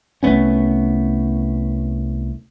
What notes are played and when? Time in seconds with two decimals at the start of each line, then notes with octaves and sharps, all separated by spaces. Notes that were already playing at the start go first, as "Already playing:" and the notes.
0.23 C2 A3 B3 C#4